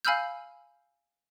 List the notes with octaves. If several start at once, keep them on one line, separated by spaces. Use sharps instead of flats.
F5 G#5 B5 E6 F6 G6